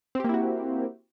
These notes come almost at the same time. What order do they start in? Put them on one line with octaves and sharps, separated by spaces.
C4 G4 A#3 E4 F#4